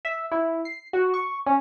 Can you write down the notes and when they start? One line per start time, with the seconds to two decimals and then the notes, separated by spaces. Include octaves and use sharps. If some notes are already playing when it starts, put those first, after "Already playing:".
0.05 E5
0.31 E4
0.65 C7
0.93 F#4
1.14 C#6
1.46 C#4